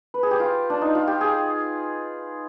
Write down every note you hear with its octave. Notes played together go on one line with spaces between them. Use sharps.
B4
G#4
G4
F4
D4
D#4
F4
G4
G#4